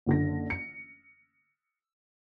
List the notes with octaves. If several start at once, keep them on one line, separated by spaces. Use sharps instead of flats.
F#1 D3 A#6
C#7